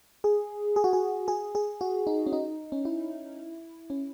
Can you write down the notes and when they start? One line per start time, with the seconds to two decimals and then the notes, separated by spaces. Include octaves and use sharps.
0.24 G#4
0.76 G#4
0.84 F#4
0.93 G#4
1.28 G#4
1.55 G#4
1.81 F#4
2.07 D#4
2.27 C#4
2.33 D#4
2.72 C#4
2.85 E4
3.90 C#4